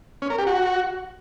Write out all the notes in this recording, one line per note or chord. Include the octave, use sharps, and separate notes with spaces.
C#4
A#4
G4
F#4